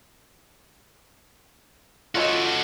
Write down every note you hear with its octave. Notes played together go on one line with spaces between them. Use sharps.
F4 F#4 A4 C#5 D#5